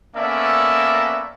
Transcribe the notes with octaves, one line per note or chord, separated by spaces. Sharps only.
A#3 B3 C#4 A4 D5 E5